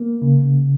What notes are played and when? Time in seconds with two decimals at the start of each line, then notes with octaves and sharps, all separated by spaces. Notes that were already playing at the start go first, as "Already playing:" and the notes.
Already playing: A#3
0.22 C#3